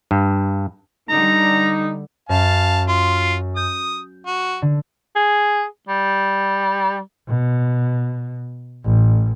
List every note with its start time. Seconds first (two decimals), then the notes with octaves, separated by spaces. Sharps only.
0.11 G2
1.09 D3 G3 D#4 A#5
2.29 F#2 F5 A5
2.88 F4
3.56 D#6 G6
4.26 F#4
4.62 D3
5.16 G#4
5.88 G3
7.29 B2
8.85 A1